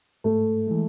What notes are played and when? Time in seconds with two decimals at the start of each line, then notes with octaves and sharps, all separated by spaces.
0.24 G#2 A3
0.67 E3 G#3